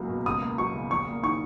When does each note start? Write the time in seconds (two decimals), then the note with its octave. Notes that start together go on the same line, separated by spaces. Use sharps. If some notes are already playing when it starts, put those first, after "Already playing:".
Already playing: C#2 F#3 G#3 A#3
0.09 B2
0.26 C#2 D#6
0.41 A#3
0.58 F#3 C#6
0.74 C#3
0.90 A#1 C#6
1.07 A#3
1.23 D#3 C#6